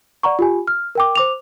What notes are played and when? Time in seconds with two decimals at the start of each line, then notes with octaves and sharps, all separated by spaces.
0.23 D5 F#5 A#5 C#6
0.39 F4 G4 G#5
0.68 F6
0.95 A#4 G5 D6
1.15 C5 D6 F7